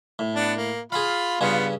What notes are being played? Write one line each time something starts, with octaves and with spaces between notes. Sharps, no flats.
A2
B3 D4 A5
A#3
F4 G#4 F5 B5
G2 C#3 B3 F4 G#4